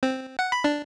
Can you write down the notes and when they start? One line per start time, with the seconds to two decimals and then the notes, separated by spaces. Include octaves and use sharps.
0.03 C4
0.39 F#5
0.52 B5
0.64 D4